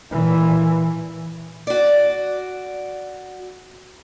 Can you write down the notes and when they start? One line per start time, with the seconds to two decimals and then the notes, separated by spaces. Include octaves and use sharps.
0.10 A#2 E3
1.67 F#4 D5